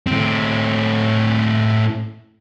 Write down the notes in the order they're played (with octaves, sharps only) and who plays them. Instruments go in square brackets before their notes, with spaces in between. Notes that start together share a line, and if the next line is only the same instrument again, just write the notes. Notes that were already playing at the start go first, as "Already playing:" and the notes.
[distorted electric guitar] A2 C4